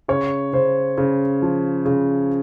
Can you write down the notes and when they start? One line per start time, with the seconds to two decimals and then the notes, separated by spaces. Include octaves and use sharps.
0.08 C#3 C#5
0.53 C#3 C5
0.98 C#3
1.42 F3
1.85 C#3